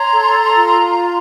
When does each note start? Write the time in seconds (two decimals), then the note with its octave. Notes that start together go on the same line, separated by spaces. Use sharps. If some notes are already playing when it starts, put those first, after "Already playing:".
Already playing: C#5 A#5 C6
0.12 A4
0.54 F4